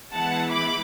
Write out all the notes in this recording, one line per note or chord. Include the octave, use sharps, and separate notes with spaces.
E3 G#3 B3 E4 F#5 A5
B5 D6